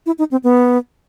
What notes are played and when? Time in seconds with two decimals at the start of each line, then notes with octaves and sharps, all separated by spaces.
0.06 E4
0.19 D#4
0.31 C4
0.44 B3